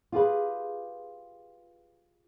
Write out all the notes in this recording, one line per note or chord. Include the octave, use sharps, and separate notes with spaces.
F4 G4 G#4 B4